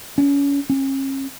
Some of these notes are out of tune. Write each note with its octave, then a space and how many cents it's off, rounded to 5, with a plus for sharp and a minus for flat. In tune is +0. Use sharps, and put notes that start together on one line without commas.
C#4 +25
C#4 -40